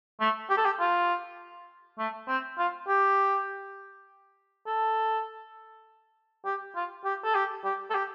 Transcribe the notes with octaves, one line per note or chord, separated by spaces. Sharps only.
A3
G4
A4
G4
F4
A3
C4
F4
G4
A4
G4
F4
G4
A4
G4
G4
A4
G4